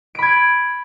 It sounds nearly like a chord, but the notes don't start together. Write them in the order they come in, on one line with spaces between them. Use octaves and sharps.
D7 B5 G#6